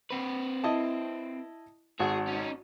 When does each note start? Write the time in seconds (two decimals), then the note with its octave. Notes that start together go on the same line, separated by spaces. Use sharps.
0.10 C4 B4
0.64 E4 D#5 A5
1.99 G#1 F#4 G#4
2.27 C#4 D#4